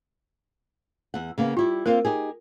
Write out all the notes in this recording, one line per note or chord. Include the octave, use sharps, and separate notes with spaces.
E2 F#5
C#3 A#3 B3
G3 E4 F4 G4
A#3 C4 F4 A#4
D#4 G4 G#4